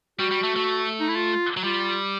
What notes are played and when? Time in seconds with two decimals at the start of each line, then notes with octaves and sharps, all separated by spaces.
0.19 G3 F#4
0.31 G3
0.43 A3
0.56 A3
1.00 D#4
1.09 E4
1.16 F4
1.57 F#3
1.64 G3 F4